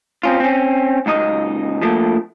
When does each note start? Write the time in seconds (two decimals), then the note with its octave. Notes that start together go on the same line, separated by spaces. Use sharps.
0.23 C4 C#4 F4
0.40 C4 C#4
1.06 C#2 F#2 D#4 D#5
1.81 F3 A3 A#3